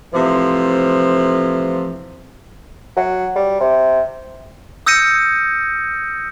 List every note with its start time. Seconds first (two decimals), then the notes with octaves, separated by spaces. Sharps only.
0.13 A2 C3 E3 F3
2.97 F#3
3.36 G3
3.60 C3
4.86 D#6 E6 G6 A#6 C#7 D#7